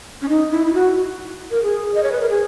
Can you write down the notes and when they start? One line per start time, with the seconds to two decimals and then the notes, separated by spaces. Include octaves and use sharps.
0.22 C#4
0.29 D#4
0.51 E4
0.67 E4
0.74 F#4
1.51 A#4
1.63 G#4
1.94 D#5
2.03 C#5
2.12 B4
2.21 A#4
2.29 G#4